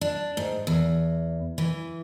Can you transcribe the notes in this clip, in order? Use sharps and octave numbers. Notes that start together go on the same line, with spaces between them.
D4
G#2
E2
E3